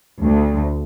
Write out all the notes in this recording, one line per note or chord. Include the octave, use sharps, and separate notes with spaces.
D2